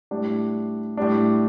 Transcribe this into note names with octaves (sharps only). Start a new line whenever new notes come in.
A2 G3 D4
A2 G3 D4